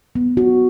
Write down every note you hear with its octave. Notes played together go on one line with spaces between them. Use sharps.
B3
F#4